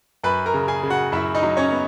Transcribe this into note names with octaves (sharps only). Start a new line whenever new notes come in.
F#2 B4 B5
A#4 A#5
C#3
G#4 G#5
C#3
F#4 F#5
F#2 E4 E5
D#4 D#5
F#3
C#4 C#5
B3